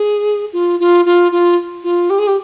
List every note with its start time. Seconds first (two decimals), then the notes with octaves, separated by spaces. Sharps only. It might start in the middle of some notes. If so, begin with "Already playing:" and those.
Already playing: G#4
0.53 F4
0.80 F4
1.06 F4
1.32 F4
1.84 F4
2.10 G4
2.19 G#4
2.27 G4